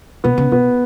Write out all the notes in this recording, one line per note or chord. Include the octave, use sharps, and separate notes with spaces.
B2 B3
C#3
B2 B3